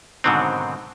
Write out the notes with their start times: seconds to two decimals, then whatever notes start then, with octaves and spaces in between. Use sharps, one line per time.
0.24 G#2 B2 D3 D#3 F#3 C4